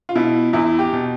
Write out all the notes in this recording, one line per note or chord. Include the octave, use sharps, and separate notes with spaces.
F4
B2 E4
E2 E4
G4
B2